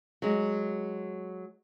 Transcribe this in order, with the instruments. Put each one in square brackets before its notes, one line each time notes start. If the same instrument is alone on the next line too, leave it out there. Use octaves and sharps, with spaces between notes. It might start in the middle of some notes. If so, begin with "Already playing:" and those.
[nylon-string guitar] F#3 G#3